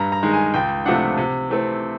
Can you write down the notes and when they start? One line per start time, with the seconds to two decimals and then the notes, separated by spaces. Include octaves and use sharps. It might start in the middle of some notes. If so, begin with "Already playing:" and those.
Already playing: G2 A#5
0.12 A#5
0.23 D#3 G#3
0.33 G#5
0.54 C#2 G5
0.85 C3 F3 A3 D4 F#5
1.17 C3
1.49 E3 A3 C4